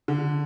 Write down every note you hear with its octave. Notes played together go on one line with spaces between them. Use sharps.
D3